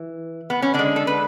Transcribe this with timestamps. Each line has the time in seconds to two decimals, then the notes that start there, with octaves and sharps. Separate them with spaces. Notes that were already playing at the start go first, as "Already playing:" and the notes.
Already playing: E3
0.50 B3
0.62 C#4
0.74 D3 D4
0.79 G#3
0.96 A4
1.07 B4